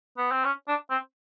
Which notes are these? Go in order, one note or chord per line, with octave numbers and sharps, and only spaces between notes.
B3
C4
C#4
D4
C4